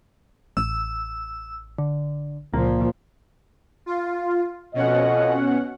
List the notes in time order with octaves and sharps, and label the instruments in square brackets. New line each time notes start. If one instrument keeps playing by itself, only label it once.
[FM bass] A1 [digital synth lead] E6
[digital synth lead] D3
[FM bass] C#2 [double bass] A#2 F3 [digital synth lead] A#3
[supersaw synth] F4
[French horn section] F2 D#5 [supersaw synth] B2 C#4 F#5